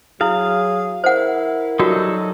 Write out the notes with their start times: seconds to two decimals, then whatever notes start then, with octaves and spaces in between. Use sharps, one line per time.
0.21 F#3 E4 G#4 F5
1.04 E4 A#4 C5 F#5
1.79 F#3 G3 D#4 F4 F#4 A4